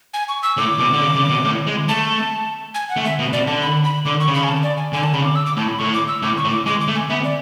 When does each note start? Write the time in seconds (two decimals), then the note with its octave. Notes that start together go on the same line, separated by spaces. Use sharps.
0.14 G#5
0.29 C#6
0.43 E6
0.57 A2 D6
0.79 B2
0.93 D3
1.01 C#3
1.15 C#3
1.30 B2
1.44 A2
1.67 G#3
1.89 A3 A5
2.75 G#5
2.89 F#5
2.97 A3
3.04 E5
3.19 B2
3.33 B2 D5
3.47 D3 A5
3.62 B5
3.84 B5
4.05 D3 D6
4.20 C#6
4.27 C#3
4.34 B5
4.44 G#5
4.48 A5
4.63 D5
4.78 G#5
4.93 D3 G#5
5.03 A5
5.13 C#3 B5
5.25 D6
5.36 E6
5.46 D6
5.57 A2 A5
5.68 B5
5.79 A2 C#6
5.94 D6
6.08 E6
6.22 A2 D6
6.37 C#6
6.44 A2
6.52 D6
6.66 G#3 D6
6.81 D6
6.88 A3
6.96 G#5
7.09 B3 E5
7.24 D5